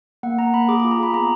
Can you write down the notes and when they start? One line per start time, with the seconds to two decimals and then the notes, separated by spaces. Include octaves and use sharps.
0.23 A#3 F#5
0.38 A#3 A#5
0.54 A#3 B5
0.68 G#4 D6
0.80 D6
0.84 F4
0.91 A#5
0.99 G#4 B5
1.14 B3 A#5